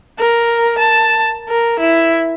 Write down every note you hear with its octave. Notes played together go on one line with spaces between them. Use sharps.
A#4
A5
A#4
E4